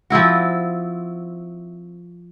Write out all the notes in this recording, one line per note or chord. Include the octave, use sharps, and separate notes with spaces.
F3 C4 E4 F#4